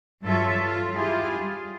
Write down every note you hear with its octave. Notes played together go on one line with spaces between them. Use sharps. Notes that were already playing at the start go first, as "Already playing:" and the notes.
G2 F#3 F4 A4 C#5 E5
F4
E4 F4 G4 G#4
G3